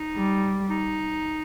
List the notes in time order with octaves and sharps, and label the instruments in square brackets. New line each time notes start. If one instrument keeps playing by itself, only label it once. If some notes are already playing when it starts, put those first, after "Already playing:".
Already playing: [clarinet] D#4
[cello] G3
[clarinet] D#4